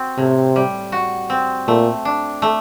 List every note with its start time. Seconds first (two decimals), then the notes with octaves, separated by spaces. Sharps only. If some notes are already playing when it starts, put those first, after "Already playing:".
Already playing: C4 F#4
0.18 A2 C3
0.56 G3
0.92 F#4
1.30 C4
1.67 A#2 A3
2.05 D4
2.42 A3